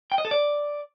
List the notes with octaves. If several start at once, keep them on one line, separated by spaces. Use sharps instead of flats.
G5
D#5
A4
D5